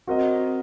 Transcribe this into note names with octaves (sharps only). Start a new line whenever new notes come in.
C4 F#4 A#4 D#5